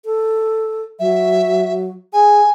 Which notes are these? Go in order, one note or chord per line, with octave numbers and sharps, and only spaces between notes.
A4
F#3 E5
G#4 G#5